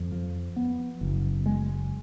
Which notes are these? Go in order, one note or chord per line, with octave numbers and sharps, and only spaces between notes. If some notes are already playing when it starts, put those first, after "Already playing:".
Already playing: F2
F3
B3
F#1
G#3